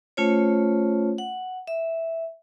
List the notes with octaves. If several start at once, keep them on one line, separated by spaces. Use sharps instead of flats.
A3 C#4 F4 C5 C#5
F#5
E5